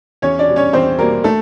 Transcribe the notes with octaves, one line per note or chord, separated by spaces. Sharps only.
E2 C#4 C#5
D4 D5
B2 G3
C#4 C#5
E2 C4 C5
B2 G3 A#3 A#4
A3 A4